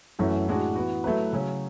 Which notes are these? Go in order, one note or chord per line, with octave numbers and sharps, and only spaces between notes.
F#2 E3 A3 C#4 F#4
A2 G#3 D4 F#4
E3 B3 F#4
F#3 A3 E4 B4
C#3 F#3 C#4